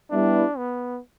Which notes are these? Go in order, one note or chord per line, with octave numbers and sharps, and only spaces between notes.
G3 B3 D4 E4
B3